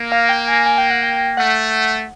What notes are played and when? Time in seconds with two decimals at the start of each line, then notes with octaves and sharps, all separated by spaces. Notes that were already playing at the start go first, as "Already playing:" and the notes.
Already playing: A#3
0.12 F5
0.29 G5
0.48 G#5
0.66 G#5
0.78 G5
0.91 F#5
1.03 G5
1.37 A3 F#5